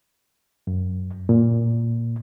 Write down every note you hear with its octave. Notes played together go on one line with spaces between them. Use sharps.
F#2
A#2